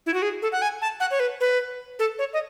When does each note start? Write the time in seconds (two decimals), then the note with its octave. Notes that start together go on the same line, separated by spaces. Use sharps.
0.06 E4
0.14 F#4
0.22 G#4
0.42 A4
0.52 F#5
0.62 G#5
0.82 A5
1.00 F#5
1.11 C#5
1.20 B4
1.40 B4
1.99 A4
2.19 C#5
2.33 D#5